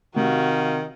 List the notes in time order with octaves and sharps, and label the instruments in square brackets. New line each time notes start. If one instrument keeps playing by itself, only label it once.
[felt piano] C3 [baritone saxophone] D#3 [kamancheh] F#4 F5